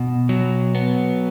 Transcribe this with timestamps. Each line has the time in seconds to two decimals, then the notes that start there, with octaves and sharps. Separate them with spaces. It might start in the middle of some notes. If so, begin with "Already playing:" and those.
Already playing: B2
0.29 F#3
0.75 B3